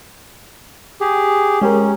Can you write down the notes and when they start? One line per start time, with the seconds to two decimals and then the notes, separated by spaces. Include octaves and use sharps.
1.01 G4 G#4
1.61 G#3 C#4 G4 A#4